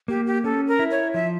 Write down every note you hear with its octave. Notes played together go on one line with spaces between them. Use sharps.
A#3 G4
G4
C#4 A4
A#4
E4
C#5
F3 E5